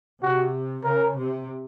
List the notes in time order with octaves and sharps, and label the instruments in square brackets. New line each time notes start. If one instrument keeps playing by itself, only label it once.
[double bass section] C3 [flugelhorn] F#4
[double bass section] C#3 [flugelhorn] A#4
[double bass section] C3